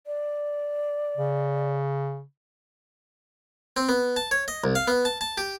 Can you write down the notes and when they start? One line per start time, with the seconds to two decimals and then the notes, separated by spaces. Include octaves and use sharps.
0.07 D5
1.17 C#3
3.77 C4
3.89 B3
4.16 A5
4.31 C#5
4.48 D#5
4.64 C2
4.75 F5
4.88 B3
5.05 A5
5.21 A5
5.38 G4